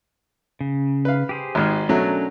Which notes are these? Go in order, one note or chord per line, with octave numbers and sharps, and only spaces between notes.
C#3
B4 F5
G4 G#4 C5
G#1 G#2 F6
B2 F#3 A3 C#4 D4 A#4